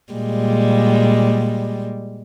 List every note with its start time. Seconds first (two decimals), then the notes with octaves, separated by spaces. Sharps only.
0.13 A#2 G3 G#3